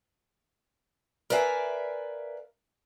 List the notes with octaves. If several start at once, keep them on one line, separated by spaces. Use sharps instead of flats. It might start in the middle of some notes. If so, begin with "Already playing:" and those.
A#4 B4 D5 E5 F5 G#5